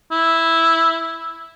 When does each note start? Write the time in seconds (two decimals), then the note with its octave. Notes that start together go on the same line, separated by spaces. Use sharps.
0.12 E4